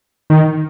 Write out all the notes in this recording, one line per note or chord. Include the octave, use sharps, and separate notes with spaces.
D#3